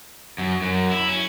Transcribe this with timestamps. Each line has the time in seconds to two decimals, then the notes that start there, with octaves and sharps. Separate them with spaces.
0.38 F#2
0.62 F#2
0.92 E4
1.09 C#4